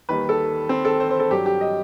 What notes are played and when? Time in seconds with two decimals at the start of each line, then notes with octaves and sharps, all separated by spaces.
0.09 D#2 D#3 G3 B4
0.29 A4
0.69 C4
0.85 A4
1.00 C5
1.10 C5
1.20 A4
1.30 G2 F#3 G4
1.46 G4
1.61 D#5